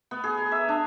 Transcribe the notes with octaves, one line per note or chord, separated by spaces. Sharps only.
B3
G#4
A#5
E5
D4